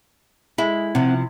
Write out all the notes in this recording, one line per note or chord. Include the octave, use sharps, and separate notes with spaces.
G#3 E4
C3 F3 C4 F#5